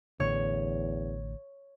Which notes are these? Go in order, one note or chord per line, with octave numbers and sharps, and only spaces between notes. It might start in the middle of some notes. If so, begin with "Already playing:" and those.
A1 E2 A2 D3 C#5